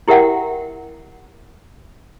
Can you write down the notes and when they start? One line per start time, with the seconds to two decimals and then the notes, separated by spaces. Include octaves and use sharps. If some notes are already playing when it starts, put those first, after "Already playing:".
0.08 E4 G4 A#4 E5 F#5 G5